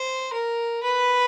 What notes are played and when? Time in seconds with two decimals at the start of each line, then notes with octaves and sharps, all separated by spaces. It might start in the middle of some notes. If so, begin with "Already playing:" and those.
Already playing: C5
0.33 A#4
0.83 B4